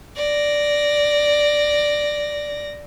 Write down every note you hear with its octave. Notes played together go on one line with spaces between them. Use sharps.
D5 A#6